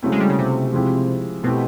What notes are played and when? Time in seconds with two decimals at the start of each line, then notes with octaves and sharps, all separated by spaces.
0.03 C#3 F#3 A3 C4 E4
0.12 G#3
0.20 G3
0.29 C#3
0.38 C3
0.73 F3 G#3 C4 E4 G4
1.43 B2 A3 C4 E4 G4